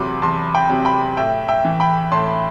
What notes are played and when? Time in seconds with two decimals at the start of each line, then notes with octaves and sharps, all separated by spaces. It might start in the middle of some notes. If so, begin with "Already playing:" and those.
Already playing: E2 C3 F#3 B5 C6 D6
0.22 E2 A5 C6
0.55 G5 B5
0.69 C3 F#3
0.85 G5 B5
1.17 A2 E5 G5
1.48 E5 G5
1.65 E3
1.80 G5 B5
2.12 A2 A5 C6